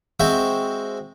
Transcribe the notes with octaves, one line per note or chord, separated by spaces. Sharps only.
G#3 C4 F#4 C5 E5